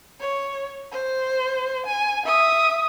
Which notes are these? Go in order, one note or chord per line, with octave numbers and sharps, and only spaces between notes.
C#5
C5
G#5
E5 D#6